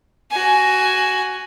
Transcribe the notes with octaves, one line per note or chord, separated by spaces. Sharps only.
F#4 G#5